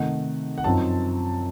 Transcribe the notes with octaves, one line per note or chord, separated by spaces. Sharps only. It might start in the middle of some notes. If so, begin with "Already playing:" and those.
Already playing: C3 D#3 A3 D#4 F#5
F#5
F#2 F3 C4 D#4 A5